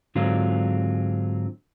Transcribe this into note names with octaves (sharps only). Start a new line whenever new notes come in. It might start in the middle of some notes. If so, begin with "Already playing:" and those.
G#2 D3 F#3 C4 F4